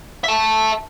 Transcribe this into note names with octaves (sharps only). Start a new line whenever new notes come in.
E5 A5